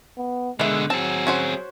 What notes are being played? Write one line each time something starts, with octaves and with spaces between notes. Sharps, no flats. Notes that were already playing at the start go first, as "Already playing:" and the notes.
B3
B2 D3 D#3 G#3 E5
F#3 C4 G#4 A5
C#4 F#4 C5